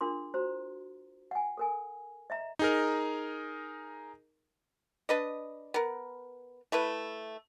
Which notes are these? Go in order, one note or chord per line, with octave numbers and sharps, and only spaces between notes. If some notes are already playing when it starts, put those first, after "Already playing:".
D4 F4 G#4 A#4 C6
F#4 C5 A#5
F#5 G#5
A4 A#4 G#5
D#5 E5 A#5
D#4 G#4 A#4
D4 B4 D#5
B3 A#4
A3 E4 B4